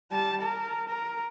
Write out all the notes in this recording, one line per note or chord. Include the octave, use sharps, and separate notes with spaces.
G3 A5
A#4
A#4